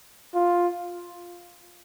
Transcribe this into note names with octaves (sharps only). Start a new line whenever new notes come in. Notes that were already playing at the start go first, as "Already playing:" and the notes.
F4